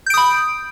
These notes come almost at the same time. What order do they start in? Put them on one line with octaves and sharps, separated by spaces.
G6 D7 D#6 B5